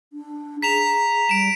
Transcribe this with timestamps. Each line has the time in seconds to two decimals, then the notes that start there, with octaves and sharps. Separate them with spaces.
0.13 D4
0.62 G#4 A#5 B6 E7 F7
1.29 G3 D7 E7